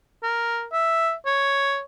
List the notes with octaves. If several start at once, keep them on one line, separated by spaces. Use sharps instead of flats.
A#4
E5
C#5